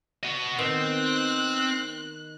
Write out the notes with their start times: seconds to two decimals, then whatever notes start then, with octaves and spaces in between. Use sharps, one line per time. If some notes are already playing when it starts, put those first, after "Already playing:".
0.23 F#4 D#5
0.58 D#3 B3 C4 F#6